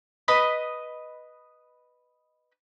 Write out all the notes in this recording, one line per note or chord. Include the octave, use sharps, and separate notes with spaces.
B4 D#5 B5